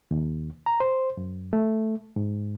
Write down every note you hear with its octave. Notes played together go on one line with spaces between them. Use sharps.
D#2
A#5
C5
F#2
A3
G#2